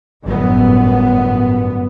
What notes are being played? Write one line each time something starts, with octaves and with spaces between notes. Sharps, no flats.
G1 F#2 A2 B3